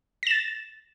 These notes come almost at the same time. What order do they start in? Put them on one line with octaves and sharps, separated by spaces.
A#6 E7 A6